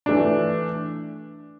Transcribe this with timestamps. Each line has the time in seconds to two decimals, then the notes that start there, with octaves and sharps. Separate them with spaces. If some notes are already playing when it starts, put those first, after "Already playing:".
0.06 E3 A3 D4